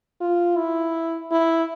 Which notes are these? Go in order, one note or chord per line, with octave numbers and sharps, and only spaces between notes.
F4
E4
E4